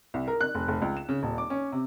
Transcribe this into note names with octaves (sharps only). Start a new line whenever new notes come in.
C2
A#4
F#6
F1
F1
C#2
E7
C#3
D#1
D6
C#4
C3